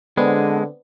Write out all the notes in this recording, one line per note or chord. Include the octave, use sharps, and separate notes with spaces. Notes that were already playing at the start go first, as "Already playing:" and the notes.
D3 G#3 B3 C4 D4